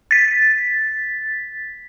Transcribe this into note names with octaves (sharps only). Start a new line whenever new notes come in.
A6 B6